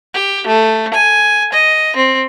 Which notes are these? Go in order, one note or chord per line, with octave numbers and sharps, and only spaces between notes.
G4
A3
G#5
D#5
C4